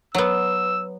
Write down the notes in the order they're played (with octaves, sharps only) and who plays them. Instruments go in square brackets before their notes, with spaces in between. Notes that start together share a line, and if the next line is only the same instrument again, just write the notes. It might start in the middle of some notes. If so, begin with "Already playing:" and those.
[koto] F#3 B3 [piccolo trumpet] E6